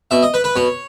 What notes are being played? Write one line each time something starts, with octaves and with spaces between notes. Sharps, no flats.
B2 E5
D#5
B4
B4
B2 C#5